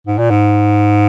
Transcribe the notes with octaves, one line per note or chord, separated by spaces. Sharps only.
G#2
A#2
G#2